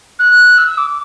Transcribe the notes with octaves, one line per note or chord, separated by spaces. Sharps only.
F#6
E6
D6